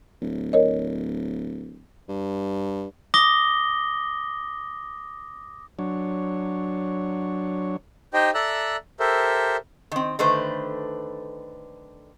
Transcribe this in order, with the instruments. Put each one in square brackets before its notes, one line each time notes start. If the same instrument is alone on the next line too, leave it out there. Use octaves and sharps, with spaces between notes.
[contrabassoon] D1
[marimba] A#4 C#5 D#5
[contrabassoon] G2
[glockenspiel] D6 D#6 A#6 G7
[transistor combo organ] F#3 D4 C#5
[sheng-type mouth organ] D#4 G4 C5 D#5 G5
A4 D5 E5 A#5 E6 F#6
G4 A4 A#4 C5 E5
[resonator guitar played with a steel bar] D#3 C4
D3 D#3 A3 B4 C5